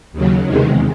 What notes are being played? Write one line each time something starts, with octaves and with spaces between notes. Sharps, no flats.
D#2 C#3 F#3
E2 C3 D#3 G#3